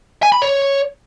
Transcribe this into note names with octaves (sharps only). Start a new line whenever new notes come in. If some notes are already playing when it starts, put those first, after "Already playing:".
G#5
B5
C#5